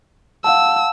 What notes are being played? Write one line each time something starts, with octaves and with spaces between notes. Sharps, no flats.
F5 F#5 A5 E6